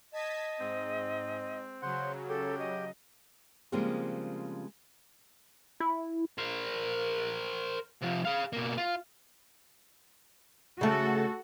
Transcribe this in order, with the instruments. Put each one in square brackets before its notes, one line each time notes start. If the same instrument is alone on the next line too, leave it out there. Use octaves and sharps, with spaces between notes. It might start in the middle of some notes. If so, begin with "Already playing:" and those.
[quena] D#5 [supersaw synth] A5 G#6 B6
[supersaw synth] G#2 [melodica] C4
[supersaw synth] C#3 F#3 [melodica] C5 F#5
[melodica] G4 [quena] A4
[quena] D#5
[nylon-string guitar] C#3 F3 G3 G#3 A#3 C4
[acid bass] E4
[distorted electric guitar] A#4 C5
C3 F3
G#4 F5
B2 A#3
F4
[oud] C#3 A3 [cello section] F#4 A4